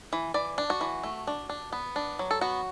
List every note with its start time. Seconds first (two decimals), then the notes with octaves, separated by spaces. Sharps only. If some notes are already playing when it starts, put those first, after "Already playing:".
0.13 E3
0.34 E3 D5
0.58 D4
0.70 F#4
0.81 E3
1.03 A3
1.27 D4
1.49 D4
1.72 B3
1.96 D4
2.19 F#3
2.31 A4
2.41 B3 F#4